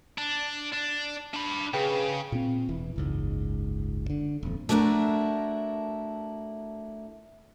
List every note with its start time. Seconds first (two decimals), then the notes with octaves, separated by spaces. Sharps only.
0.18 D4
0.72 D4
1.34 D4 B5
1.73 C#3 G#4 B4 G5
2.32 A#2 C4
2.69 E1 E3
2.96 F#1 C#2 G#2
4.10 D3
4.43 D#1 F2
4.69 A3 D4 E4 F#4 A#4